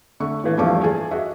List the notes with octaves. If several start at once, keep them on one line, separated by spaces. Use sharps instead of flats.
D3 A3 C#6
A2 E3
E2 G2 F3 A3 C#6 D6
G#4 A5
F#4 D#5 E5